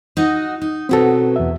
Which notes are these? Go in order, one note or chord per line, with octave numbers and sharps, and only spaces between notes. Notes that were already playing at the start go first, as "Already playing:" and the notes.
D#4 F#4 D#5
D#4
B2 F#3 C4 F#4 A4 B4
E2 E5